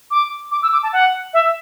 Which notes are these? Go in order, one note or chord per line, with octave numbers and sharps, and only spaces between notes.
D6
D6
E6
D6
A5
F#5
E5